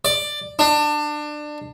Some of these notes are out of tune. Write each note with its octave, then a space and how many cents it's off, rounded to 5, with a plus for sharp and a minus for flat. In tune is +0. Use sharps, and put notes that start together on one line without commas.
D5 +10
D4 +25